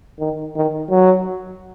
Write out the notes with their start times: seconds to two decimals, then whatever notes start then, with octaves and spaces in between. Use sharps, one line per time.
0.20 D#3
0.56 D#3
0.90 F#3